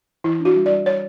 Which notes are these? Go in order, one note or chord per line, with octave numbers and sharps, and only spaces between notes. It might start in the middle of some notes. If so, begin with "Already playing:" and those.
E3 E4
D4
F#4
G3
D5
G3
G3 C#5